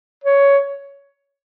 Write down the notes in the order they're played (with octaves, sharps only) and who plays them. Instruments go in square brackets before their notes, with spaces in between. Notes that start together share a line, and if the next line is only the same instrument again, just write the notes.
[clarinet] C#5